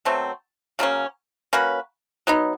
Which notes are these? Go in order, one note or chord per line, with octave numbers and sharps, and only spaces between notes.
B2 F#3 A3 C4
C#3 F#3 A#3 C#4
A#3 C#4 F#4 B4
F#3 B3 D#4